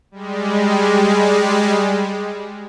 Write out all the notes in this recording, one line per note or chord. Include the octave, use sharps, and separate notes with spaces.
G3 G#3